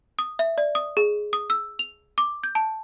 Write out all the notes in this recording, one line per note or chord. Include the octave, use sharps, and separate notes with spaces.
D#6
E5
D5
D#6
G#4
D#6
E6
F7
D6
G6
A5